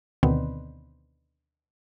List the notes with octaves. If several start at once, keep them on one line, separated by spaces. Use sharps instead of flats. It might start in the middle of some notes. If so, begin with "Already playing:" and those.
D2 B2 D3 D#3 B3 C4